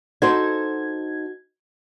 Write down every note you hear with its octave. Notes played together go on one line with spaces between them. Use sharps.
D#4 F#4 A4 C5 G#6